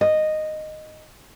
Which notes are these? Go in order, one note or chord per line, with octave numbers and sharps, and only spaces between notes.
D#5